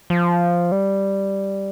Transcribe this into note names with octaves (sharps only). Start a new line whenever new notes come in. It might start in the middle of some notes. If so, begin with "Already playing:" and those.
F3
G3